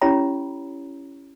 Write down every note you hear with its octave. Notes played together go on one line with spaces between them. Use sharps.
C#4 E4 G4 C#5 A#5 B5